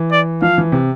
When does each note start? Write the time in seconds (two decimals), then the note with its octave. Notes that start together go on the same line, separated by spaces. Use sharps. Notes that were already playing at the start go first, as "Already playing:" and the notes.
Already playing: E3
0.12 D5
0.42 F3 F5
0.58 E3
0.72 C3